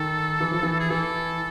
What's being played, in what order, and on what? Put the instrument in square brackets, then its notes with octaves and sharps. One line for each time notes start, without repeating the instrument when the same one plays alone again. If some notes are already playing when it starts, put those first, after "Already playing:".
Already playing: [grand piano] D#3 [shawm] A4
[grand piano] E3
F3
E3
[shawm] G#4
[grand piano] E3 [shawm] A4